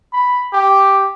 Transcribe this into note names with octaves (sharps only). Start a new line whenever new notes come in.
B5
G4